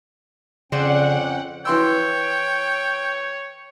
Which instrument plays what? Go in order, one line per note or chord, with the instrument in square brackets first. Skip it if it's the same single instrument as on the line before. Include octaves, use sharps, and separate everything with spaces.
[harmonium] F2 C#4 G5 [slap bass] C#3 [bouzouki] C5 D5 E5 [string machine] F#5
[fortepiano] E3 C6 E6 [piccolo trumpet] C#5 [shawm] G5